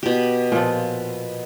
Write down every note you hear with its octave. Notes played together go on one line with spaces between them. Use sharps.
B2 G4
A#2 F3